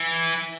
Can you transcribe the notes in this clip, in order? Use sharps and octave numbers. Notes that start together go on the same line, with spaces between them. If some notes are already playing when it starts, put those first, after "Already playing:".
Already playing: E3